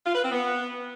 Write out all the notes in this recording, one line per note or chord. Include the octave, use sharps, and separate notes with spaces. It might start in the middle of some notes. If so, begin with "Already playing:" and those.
F4
B4
C4
B3